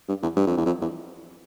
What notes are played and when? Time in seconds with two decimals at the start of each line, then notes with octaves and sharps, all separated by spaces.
0.09 G2
0.22 E2
0.37 G2
0.47 F2
0.57 E2
0.66 F2
0.82 E2